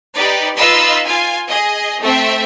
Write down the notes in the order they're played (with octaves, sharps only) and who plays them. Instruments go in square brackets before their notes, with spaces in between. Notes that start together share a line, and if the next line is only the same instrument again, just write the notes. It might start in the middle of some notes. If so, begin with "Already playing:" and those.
[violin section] D#4 G4 B4 D5
D#4 F4 B4 D#5 B5 E6
F4 G#5
G#4 D#5
A3 C4 E5